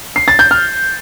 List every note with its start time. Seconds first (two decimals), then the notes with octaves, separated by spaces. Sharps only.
0.16 C7
0.28 A6
0.39 G6
0.51 F6